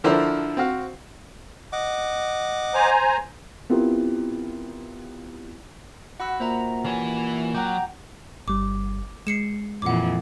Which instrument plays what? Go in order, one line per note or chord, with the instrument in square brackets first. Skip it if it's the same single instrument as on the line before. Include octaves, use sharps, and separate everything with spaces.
[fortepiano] D3 F3 E4 A#4 C5 D5
C4 F#4 F5
[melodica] D#5 F#5 D6
[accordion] C5 G#5 A#5
[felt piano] B3 C4 E4 F4 G4 A#4
[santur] F#4 [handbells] F#5 B5 E6
[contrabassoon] A#2 [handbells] C5 E5 A#5
[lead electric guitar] E3 B4 [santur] C#4 [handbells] G4 G#5
[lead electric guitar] F#3 [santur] F#5 D6 [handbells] G5 A#5 G6
[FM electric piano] G1 G3 [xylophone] D6
[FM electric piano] G#3 [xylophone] C7 C#7 E7
[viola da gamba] F2 A#2 E3 [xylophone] F#5 D6